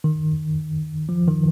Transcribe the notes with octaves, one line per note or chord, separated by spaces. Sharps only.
D#3
F3
D#3